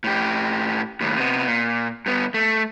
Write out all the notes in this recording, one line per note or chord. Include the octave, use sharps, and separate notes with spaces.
A2 G4
D#2 A2
C3 B3
A#2
G2 B3
A3